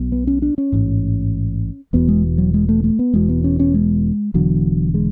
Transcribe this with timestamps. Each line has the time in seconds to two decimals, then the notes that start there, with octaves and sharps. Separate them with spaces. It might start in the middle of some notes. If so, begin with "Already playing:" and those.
Already playing: B1 B2
0.12 B3
0.27 C#4
0.42 D4
0.58 C#4
0.72 A1 G#2
1.93 E1 E2 B2 B3
2.08 G#3
2.38 F#3
2.54 G#3
2.69 A3
2.84 A3
2.99 B3
3.14 E1 E2 B2 G#3
3.29 B3
3.44 C#4
3.59 C#4
3.74 G#3
4.34 E1 E2 D3 F#3
4.94 G#3